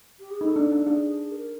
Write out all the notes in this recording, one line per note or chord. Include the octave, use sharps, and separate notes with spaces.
G4
G#4
D#4 A4
D4
D4
D4 G#4
A#4